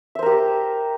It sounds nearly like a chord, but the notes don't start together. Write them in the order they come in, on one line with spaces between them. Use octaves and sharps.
E5 C5 A#4 G4